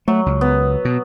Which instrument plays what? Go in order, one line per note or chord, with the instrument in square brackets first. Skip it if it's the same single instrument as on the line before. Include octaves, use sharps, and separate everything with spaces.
[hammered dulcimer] F#3 [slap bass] A3
[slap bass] C#2
[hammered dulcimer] B3
[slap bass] B2